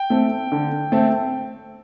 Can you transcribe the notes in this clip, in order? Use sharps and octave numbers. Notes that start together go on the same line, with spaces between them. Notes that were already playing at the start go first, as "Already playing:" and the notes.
Already playing: G5
A3 C4
D3
A3 C4